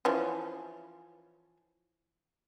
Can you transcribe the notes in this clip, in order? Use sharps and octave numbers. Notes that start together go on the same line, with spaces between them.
E3 F3 C#4